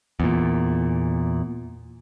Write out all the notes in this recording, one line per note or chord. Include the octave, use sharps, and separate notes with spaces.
E2 A#2